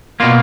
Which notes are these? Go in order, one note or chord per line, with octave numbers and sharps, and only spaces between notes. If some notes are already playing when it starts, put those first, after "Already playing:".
B2 A#3 F4